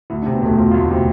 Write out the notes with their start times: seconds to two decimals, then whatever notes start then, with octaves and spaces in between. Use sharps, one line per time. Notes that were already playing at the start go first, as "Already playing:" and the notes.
0.10 D2 E4
0.22 D4
0.26 C3
0.34 B3
0.42 E1 A3
0.58 E1 F4
0.71 D2 F4
0.82 E4
0.90 C3